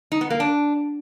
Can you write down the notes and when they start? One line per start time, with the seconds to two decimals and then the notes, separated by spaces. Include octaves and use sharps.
0.12 D#4
0.21 B3
0.30 A#3
0.40 D4